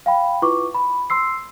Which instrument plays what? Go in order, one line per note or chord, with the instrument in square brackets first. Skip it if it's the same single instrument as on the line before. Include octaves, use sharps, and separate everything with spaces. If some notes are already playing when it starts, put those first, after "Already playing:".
[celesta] F5 G5 B5
E4 F4 B4 C#6 D6
B5
C6 E6 C7